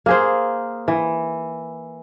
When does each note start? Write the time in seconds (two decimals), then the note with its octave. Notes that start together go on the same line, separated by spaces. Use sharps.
0.06 A#3 G#4 C5
0.88 E3